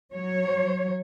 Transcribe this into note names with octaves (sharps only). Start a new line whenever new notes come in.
F#3 C#5